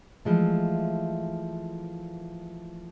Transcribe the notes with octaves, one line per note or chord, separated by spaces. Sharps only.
E3 F3 G#3 A3